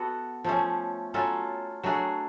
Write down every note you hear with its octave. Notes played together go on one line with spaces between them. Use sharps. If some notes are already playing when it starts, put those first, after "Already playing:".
Already playing: B3 F#4 A4
F3 A3 C#4
F#3 C#4 F4 A4
F#3 A3 D4 G#4